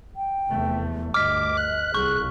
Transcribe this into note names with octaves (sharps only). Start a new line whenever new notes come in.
G5
F1 E2 A3
D2 G2 D#5 D6 F6 B6
F#6
C2 G#4 C#6 G6